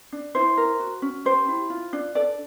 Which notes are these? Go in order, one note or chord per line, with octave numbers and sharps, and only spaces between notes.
D4
E4 C5
A#4
F#4
C#4
G4 C5
E4
F4
D4
A4 D5